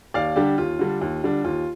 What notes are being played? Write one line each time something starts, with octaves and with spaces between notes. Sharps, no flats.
D#2 D5 F5
D3 G3 D4 G4
D#2 F4
D3 G3 D4
D#2
D3 G3 D4
D#2 F4